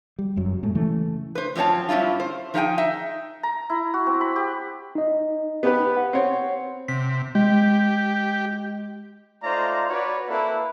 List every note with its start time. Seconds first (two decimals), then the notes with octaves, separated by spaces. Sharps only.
0.19 G3
0.36 F#1 F#2 F#3
0.63 A2 G#3 A3
0.75 C#3 E3 A3
1.35 B4 C5
1.55 F#2 F3 C4 C#5 A5
1.89 G2 G3 C#4 E4 F4
2.20 C5
2.54 F3 D#4 G#4 F5 G5 G#5
2.78 D#4 E5
3.43 A#5
3.70 E4
3.94 F#4
4.06 C4
4.21 B5
4.36 G4
4.95 D#4 D#5
5.63 B3 G4 B4
5.97 F#5
6.13 C4 C#5
6.88 C3 B6
7.35 G#3 G4
9.43 A3 D#4 F4 C5 D5 A#5
9.88 F#4 B4 C#5 D5
10.28 A#3 C4 E4 A4 B4